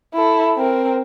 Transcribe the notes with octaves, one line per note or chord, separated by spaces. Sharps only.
E4 A4
C4 A#4